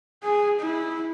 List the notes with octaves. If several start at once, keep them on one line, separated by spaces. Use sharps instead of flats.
G#4
E4